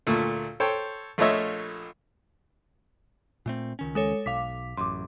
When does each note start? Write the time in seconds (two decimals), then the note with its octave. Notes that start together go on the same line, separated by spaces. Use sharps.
0.07 D2 A#2 A3
0.60 A4 C5 C#5 G5
1.18 A#1 A3 F4 C#5 D#5 E5
3.46 A#2 A3 C4
3.79 C#2 D#3 C#4
3.95 G#3 A4 C#5
4.26 B1 F5 D6 B6
4.77 A1 F#2 C6 D6